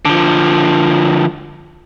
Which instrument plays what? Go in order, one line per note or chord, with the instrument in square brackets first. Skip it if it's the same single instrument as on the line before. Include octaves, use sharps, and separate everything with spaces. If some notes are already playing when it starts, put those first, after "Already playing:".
[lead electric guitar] D3 F3